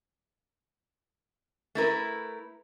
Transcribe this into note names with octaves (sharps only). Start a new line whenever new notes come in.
A3 E4 A#4 B4